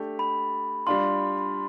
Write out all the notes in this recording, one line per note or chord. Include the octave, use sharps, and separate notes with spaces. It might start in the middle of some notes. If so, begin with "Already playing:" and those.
Already playing: A3 D4 G4
B5
G3 D4 F4 C6